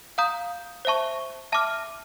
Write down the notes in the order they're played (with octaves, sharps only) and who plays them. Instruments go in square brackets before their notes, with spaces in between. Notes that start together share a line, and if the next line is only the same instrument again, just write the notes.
[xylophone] F5 A#5 D#6 G6
C5 E5 A5 C#6
E5 A5 D6 F6